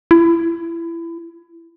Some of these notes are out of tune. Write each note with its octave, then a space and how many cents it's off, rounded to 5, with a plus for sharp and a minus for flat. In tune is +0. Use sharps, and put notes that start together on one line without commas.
E4 +25